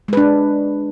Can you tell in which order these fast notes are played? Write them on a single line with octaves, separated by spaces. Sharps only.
G#3 B4 D4